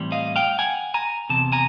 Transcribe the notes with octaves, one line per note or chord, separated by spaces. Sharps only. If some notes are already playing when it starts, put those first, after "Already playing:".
Already playing: A2 E3 G3 C4
D#5 F5
F5 G5
F#5 G#5
G#5 A#5
E2 C3 A5
G#5 A#5